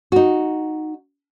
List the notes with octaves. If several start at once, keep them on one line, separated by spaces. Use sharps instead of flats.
D#4 F#4